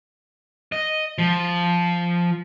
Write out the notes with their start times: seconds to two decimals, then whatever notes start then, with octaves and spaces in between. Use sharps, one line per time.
0.72 D#5
1.18 F3